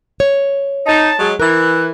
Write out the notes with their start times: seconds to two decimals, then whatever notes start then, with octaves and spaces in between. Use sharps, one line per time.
0.20 C#5
0.86 D#4 A5
1.18 F#3 G#3
1.40 E3 A#4 F#6